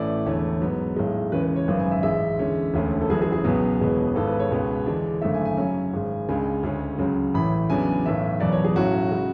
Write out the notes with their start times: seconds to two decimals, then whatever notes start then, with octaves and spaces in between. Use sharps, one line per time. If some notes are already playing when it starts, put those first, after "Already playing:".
Already playing: A1 A2 E3 A3 C#4 D5
0.26 E1 E2 D3 A3 C#5
0.61 G#2 F#3 B3
0.96 B1 A2 G#3
1.32 E2 C#3 G#3 C#4 B4
1.43 B4
1.56 C#5
1.68 G#1 F#2 C#3 B4
1.79 G#5
1.91 E5
2.03 A1 G#2 G#3 E5
2.39 E2 D3 G#3 C#4
2.74 E1 D2 D3 A3 C#4
3.01 A4
3.09 F#1 F#2 E3 G#4
3.22 G#4
3.32 G#4
3.44 C#2 B2 F#3 B3
3.80 E1 E2 B2 G#3 B3
4.15 G#1 G#2 G#3 B3 A4
4.27 B4
4.39 C#5
4.50 C#2 B2 G#3 B3
4.86 E2 D3 G#3 D4
5.22 G#1 F#2 D3 A3 E5
5.34 G#5
5.45 G#5
5.57 F#2 C#3 F#3 C#4
5.93 G#1 G#2 G#3
6.29 C#2 C#3 G#3 D4 G#5
6.63 D2 C#3 G#3 C#4
6.98 C#2 C#3 F#3
7.34 A1 A2 E3 B5
7.70 E2 C#3 F#3 B3 D4 G#5
8.05 B1 A2 E3 E5
8.40 F#1 E2 B2 F#3 D5
8.52 C#5
8.64 G#4
8.76 B1 A2 F#3 C#4 F#4
9.11 C#3 G#3